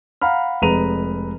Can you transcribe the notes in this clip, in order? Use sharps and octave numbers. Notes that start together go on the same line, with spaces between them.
F5 F#5 A#5 B5 F6
F1 G#3 B4 A#5 D#7 F7